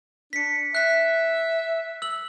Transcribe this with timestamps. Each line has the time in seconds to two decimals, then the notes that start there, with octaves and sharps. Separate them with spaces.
0.33 D4 B6 C#7
0.75 E5 F#6 B6
2.02 E6 F#7